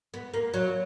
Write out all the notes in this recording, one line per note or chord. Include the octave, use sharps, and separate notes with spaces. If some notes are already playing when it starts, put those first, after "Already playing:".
B3
A#3
F#3